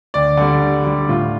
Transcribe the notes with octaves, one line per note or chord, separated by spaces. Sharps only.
D2 D5
D3 G3
D2
D3 G3
A2 F4